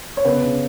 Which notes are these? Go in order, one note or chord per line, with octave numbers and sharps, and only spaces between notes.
C#5
C#3 B3 B4
C#3